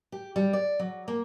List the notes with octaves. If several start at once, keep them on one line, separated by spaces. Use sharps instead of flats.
G4
G3
D5
F#3
A#3